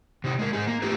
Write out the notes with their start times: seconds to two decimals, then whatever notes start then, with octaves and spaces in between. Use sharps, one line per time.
0.24 C3 D#4
0.39 G#3 A#4
0.53 G#2 D#4 G#4
0.67 A#3
0.82 A3 D#4 F4 G4 A4 B4